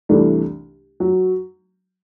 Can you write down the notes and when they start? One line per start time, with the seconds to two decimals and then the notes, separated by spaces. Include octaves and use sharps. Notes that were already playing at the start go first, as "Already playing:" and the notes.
0.09 C2 C3 E3 A3 D4
1.00 F#3